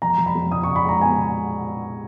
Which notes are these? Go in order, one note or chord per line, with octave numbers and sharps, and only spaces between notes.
F2 A#5
F2
B5
F2
C#3 D#6
C#6
C#3
B5
G#3 A#5
B3 G#5
C#3